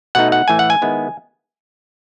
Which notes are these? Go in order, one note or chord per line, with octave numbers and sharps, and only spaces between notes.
B2 A3 D#4 F#5
F#5
A2 E3 A3 G#5
F#5
G#5
D#3 G#3 B3 E4